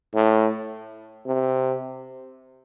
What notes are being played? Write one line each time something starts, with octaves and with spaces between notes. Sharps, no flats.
A2
C3